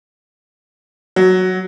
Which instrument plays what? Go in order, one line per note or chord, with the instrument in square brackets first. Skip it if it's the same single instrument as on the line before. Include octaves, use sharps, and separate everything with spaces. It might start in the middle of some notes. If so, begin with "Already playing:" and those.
[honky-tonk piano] F#3